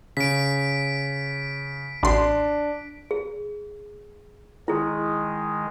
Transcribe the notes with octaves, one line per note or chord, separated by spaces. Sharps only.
C#3 B6 D7
A1 D4 C6
G#4
D#3 G#3 E4 G#4